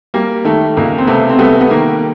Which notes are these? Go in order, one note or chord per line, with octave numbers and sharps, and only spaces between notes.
G3 A#3
D#3 A3
C#2 A#3
C4
C3 A3 B3
C4
G3 A3 B3
B3
D#3 A#3